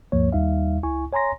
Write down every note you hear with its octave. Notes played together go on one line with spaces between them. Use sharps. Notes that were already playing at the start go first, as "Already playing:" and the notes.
D2 G2 F3 A#3 C#5
D#2 G3 D#4 E5 F5
C#2 E4 G#5 C#6
C#5 G#5 A#5 C6 A#6